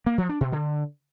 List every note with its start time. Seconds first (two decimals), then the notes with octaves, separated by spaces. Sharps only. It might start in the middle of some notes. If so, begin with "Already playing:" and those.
0.06 A#3
0.18 F3
0.29 D4
0.41 B2
0.52 D3